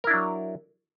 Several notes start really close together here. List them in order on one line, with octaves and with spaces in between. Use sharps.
A#4 E4 D4 F#3